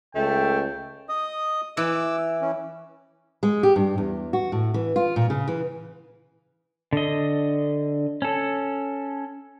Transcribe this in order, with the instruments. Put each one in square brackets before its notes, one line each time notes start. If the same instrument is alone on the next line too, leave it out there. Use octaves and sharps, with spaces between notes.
[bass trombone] C#2 [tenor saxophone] A3 [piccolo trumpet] G5
[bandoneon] D#5 D#6
[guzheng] E3 [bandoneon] D6 E6
[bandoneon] E3 C#4
[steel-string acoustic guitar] G#3
G4
G2
E2
F#4
A2
E3
F4
A#2
C#3
E3
[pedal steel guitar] D3 D#5
C#4 A4